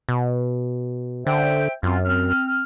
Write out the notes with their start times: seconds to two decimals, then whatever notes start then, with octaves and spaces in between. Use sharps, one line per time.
0.09 B2
1.27 D3 C5 E5 G5
1.83 F#2 C4 F4
2.05 C4 F6